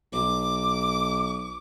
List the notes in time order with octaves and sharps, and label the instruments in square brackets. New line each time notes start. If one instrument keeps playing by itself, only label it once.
[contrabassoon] B1 [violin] D6